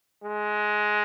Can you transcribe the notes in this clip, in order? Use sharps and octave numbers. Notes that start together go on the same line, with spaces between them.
G#3